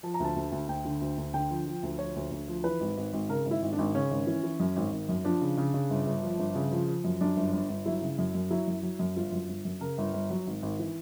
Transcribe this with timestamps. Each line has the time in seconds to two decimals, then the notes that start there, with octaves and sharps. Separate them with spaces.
0.03 F3 A5
0.14 A#5
0.20 D2 A5
0.36 D2
0.52 D2
0.68 D2 G5
0.85 D3
1.01 D2
1.17 D2
1.34 D3 G5
1.50 F3
1.66 F3
1.83 D2
1.98 F3 C#5
2.16 D2
2.31 D2
2.48 F3
2.64 E3 B4
2.80 G#1
2.97 G#1
3.13 G#1
3.29 C#3 A#4
3.45 G#1
3.51 E4
3.62 G#1
3.73 D4
3.78 G#1
3.94 C#3 C#4
4.11 G#1
4.27 E3
4.43 E3
4.60 F#2
4.76 G#1
4.92 G#1
5.09 F#2
5.24 F3 D4
5.41 C#3
5.57 C#3
5.74 C#3
5.90 G1
6.06 G1
6.23 F3
6.39 G1
6.55 C#3
6.71 F3
6.88 F3
7.04 F#2
7.21 F#2 D4
7.36 G1
7.53 G1
7.69 G1
7.86 F#3 E4
8.02 C#3
8.18 F#2
8.34 F#2
8.51 F#3 E4
8.67 F#2
8.83 F#3
8.99 F#2
9.16 G1 F4
9.32 F#2
9.48 G1
9.65 F#2
9.80 C#3 A#4
9.98 G1
10.13 G1
10.30 F#3
10.47 G#1
10.62 G#1
10.79 E3